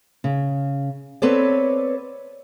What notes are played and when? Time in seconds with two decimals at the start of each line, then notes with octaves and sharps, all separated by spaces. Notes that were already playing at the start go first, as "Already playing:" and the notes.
0.24 C#3
1.22 B3 C4 A4 B4 C#5 D5